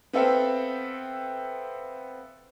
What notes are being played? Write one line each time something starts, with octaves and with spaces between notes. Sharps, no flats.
B3 C4 A4 E5 F5 G5